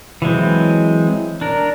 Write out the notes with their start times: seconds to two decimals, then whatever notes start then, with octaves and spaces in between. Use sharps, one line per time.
0.22 E3 F#3 G#3 C4
1.41 D4 A#4